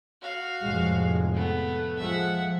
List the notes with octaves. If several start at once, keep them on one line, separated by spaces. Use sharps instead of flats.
F#4 F5
F1 A2 G#3
A3 B3
F3 G#3 E5 F#5